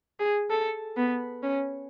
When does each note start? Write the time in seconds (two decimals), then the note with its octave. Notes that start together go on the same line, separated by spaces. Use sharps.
0.20 G#4
0.50 A4
0.97 B3
1.43 C#4